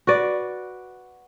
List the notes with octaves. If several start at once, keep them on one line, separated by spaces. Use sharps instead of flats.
F#4 B4 D5